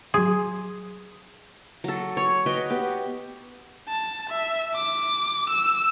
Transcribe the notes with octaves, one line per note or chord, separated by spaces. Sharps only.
F#3 G#4 C6
F#3 A4
C#5
F#4 B4 D#5 G5
B3 G4
A5
E5
D6
E6